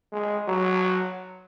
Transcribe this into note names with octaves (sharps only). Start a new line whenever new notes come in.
G#3
F#3